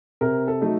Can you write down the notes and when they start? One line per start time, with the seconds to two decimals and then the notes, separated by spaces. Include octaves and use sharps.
0.21 C3 A#4
0.48 A4
0.61 F#3 A3 D#4